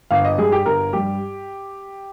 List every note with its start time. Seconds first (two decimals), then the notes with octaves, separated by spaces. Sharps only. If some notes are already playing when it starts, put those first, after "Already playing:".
0.11 G1 F5
0.25 D#5
0.38 G2 G3 G#4
0.52 G4
0.66 G1 A#4
0.93 G2 G3 G4